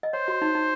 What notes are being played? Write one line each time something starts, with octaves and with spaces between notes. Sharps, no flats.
D#5
C5 C#5
F#4
D#4
D#4